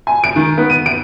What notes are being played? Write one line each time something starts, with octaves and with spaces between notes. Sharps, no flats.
G#5
D7
D#3
B3
D#7
D7